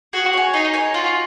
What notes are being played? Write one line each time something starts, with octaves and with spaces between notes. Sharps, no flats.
F#4 G#4
C#5 G#5
D#4 G#4
C#5 G#5
F4 F#4